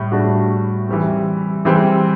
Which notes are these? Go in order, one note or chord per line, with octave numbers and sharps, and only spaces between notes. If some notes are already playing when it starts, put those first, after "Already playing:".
Already playing: A2 G3
A2 G3 D4 F#4
E3 G3 C4
E3 G3 C4